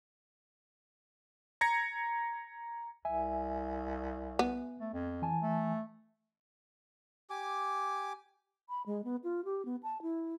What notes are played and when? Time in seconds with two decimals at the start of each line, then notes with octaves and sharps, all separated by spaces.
1.61 A#5 G#6 A#6 C#7
3.05 C2 E5 G#5
4.39 B3
4.80 A3
4.93 F2
5.22 E3 G#5 A5
5.42 A3
7.30 G4 G#5 D6
8.69 B5
8.86 G#3
9.04 B3
9.24 F4
9.45 G4
9.65 B3
9.83 A5
10.02 E4